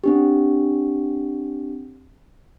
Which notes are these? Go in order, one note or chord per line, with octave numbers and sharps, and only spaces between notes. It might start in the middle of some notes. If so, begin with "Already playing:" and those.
C4 D4 G4